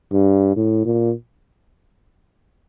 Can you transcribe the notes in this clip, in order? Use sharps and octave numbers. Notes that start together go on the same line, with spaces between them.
G2
A2
A#2